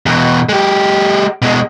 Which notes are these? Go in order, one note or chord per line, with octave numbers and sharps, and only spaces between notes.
E2 B2
G#3 G4
B2 G#3